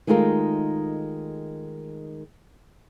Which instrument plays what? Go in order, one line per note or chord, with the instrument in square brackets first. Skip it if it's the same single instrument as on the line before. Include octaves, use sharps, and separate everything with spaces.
[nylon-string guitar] D#3 G#3 A3 D#4 F4 A#4